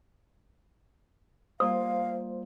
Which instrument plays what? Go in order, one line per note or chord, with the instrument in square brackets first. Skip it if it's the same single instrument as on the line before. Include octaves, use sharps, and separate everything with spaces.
[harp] G3 A#3 F4 [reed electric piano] C5 [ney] F5 [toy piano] D#6